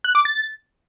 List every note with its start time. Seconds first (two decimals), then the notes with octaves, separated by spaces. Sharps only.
0.04 F#6
0.15 D6
0.25 A6